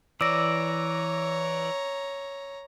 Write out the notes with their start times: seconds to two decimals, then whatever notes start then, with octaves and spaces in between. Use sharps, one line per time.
0.21 E3 C#5 D5 A#5 E6 A#6